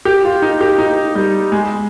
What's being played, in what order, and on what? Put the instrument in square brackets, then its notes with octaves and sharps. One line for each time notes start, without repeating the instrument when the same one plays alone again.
[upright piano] G4
F4
D#4
G4
D#4
G3
G#3